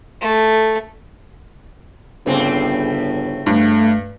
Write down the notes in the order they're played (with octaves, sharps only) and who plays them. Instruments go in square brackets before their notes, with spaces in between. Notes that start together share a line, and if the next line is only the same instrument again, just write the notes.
[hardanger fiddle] A3
[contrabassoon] G1 [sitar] A2 C#3 C4
[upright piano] G2 [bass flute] A3